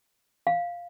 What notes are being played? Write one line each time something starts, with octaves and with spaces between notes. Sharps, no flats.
F5